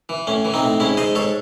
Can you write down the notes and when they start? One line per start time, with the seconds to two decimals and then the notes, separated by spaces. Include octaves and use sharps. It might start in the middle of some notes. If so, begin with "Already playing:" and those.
0.09 E3
0.27 A2 C#4
0.45 E3
0.54 C4 D#4
0.63 A2
0.80 G#2 C#4 E4
0.97 G#2 C5 D#5
1.15 G#2 A4 C#5